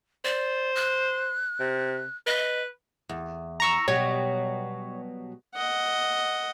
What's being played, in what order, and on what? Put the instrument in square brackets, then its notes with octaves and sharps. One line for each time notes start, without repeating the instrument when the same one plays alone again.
[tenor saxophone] C5 [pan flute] D5
[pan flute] F#6
[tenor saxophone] C3
[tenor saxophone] B4 [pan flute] D#5
[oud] E2
[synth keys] A#5 C#6 E6
[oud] B2 F#3 G3 [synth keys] C#5
[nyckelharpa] D#5 F#5